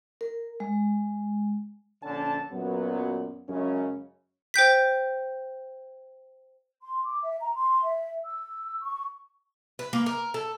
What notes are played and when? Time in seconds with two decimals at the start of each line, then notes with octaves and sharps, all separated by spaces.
0.21 A#4
0.60 G#3
2.03 A#1 D3 C#4 A5
2.51 F#2 A#2 F#3 B3
3.48 F#2 C#3 G#3 C#4
4.54 C5 G5 G6 B6
6.83 C6
7.04 D6
7.21 E5
7.41 A#5
7.55 C6
7.83 E5
8.24 E6
8.82 C#6
9.79 B4
9.93 A#3
10.06 A#4
10.34 A4